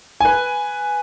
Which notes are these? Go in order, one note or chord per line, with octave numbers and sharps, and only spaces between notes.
B4 G#5